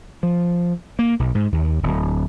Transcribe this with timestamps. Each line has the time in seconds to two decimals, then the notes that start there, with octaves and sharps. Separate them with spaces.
0.23 F3
0.99 A#3
1.19 B1
1.35 G#2
1.52 D#2
1.83 D1